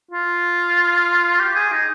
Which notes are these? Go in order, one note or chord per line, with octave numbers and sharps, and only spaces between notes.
F4
G4
G#4
D#4